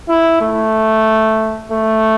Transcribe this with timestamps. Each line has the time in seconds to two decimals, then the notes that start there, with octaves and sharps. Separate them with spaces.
0.09 E4
0.41 A3
1.72 A3